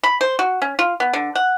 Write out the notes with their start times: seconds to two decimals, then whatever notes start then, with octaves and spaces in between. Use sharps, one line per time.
0.03 B5
0.21 C5
0.39 F#4
0.62 C#4
0.79 F4
1.00 B3
1.13 D3
1.35 F#5